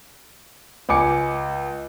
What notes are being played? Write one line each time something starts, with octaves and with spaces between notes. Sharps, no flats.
C#2 G#5 D6 C#7